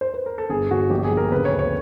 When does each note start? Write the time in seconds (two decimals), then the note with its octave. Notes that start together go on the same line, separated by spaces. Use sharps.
0.01 C5
0.14 B4
0.26 A#4
0.38 A4
0.50 G1 G#4
0.71 G1 F#4
0.90 A#1 G4
1.04 G#4
1.11 A#1
1.17 A#4
1.32 C#3 B4
1.45 C#5
1.52 D2
1.59 C#5